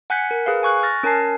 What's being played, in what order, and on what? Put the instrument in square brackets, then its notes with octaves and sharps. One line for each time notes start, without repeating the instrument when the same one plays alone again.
[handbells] F#5 G#5 F#6 G6 B6 C#7
A#4
G#4 B4 F5
G#5 C#6 F#6
F6 A6 A#6
C#4 A#4 G#5 A5 C7